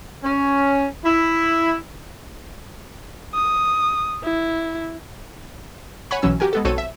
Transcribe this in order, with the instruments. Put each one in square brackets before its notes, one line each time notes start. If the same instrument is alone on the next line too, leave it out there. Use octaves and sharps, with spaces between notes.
[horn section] C#4
E4
[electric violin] D#6
E4
[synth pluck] C#5 F#5 G#5 B5 C#6
B1 E3 F#3 C#4 E6
F#4 G4 A#4 G#5
G#3 B3 A4
B1 C4 F#4 A4 C#5 D#7
E5